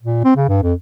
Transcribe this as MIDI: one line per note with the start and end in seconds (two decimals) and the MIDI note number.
0.03 0.22 46
0.24 0.33 60
0.36 0.46 49
0.48 0.62 43
0.63 0.73 41